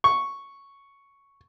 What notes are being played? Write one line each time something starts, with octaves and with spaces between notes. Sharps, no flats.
C#6